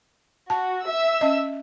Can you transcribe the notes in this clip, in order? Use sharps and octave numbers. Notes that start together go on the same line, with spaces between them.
F#4 A5
E5 E6
C#4 D#5